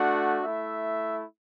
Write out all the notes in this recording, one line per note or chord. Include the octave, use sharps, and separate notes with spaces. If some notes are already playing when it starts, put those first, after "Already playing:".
Already playing: A3 D4 F#4 F#5
A3 E4 E5